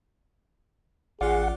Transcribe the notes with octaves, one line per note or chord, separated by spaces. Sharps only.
A1 F4 G#4 D5 F#5